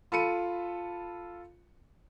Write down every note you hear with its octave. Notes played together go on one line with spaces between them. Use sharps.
F4 A4 B5 C#7 D#7